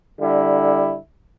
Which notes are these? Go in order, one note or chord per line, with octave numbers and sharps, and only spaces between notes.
D3 G3 E4